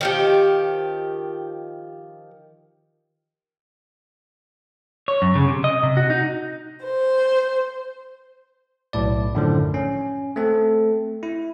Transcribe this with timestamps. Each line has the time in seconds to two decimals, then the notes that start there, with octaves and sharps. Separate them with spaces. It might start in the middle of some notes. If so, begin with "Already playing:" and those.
0.01 D#3 F3 G4
5.08 C#5
5.22 F#2
5.35 C#3
5.48 C3
5.64 D#5
5.83 C3
5.97 F#4
6.10 D#4
6.85 C5
8.93 B1 A2 D5
9.35 F#2 A2 D3 D#3 F3
9.74 C#4
10.36 A3 C4 A4
11.23 E4